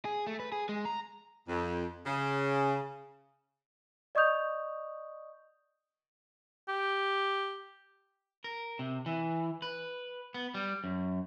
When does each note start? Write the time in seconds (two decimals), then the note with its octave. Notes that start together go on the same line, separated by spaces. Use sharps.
0.05 G#4
0.27 A3
0.40 B4
0.52 G#4
0.69 G#3
0.85 A#5
1.48 F2
2.06 C#3
4.15 D5 D#5 C#6 D#6 G6 F7
6.69 G4
8.44 A#4
8.79 C3
9.06 E3
9.62 B4
10.34 B3
10.54 G3
10.84 F#2